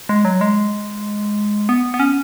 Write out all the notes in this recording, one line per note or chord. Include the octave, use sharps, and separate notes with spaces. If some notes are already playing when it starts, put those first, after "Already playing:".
G#3
F#3
G#3
B3
B3
C#4